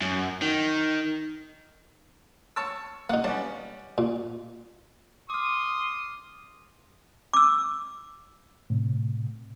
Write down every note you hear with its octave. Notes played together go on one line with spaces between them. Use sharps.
F#2
D#3
C#5 A5 E6
A#3 D#4 F#5
G3 B3 C#4 A5
A#2
C6 D6 D#6 F6
D6 E6
A2 C3